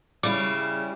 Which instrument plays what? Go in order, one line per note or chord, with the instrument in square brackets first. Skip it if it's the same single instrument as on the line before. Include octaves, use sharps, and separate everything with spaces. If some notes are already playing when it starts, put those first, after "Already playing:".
[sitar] C#3 [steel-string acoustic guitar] G3 E4 [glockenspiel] D6